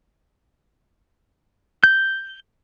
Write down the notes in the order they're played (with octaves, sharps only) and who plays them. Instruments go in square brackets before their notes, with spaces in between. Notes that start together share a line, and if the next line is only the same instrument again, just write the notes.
[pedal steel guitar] G6